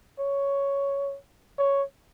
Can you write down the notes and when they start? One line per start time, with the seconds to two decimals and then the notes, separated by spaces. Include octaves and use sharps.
0.19 C#5
1.58 C#5